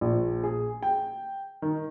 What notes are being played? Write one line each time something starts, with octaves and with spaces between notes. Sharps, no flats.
A#1
G#4
G5
D#3